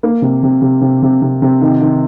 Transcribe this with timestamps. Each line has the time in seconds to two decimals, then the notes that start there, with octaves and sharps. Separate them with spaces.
0.03 A#3
0.22 C3
0.43 C3
0.62 C3
0.81 C3
1.02 C3
1.22 C3
1.42 C3
1.61 D#3
1.81 D#3